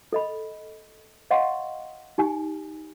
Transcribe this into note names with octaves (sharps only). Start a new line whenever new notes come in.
A4 D#5 B5
C#5 D#5 F5 F#5 C6 C#6
D#4 G4 G#5